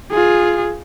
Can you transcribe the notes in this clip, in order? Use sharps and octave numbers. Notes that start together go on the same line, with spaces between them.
F4 G#4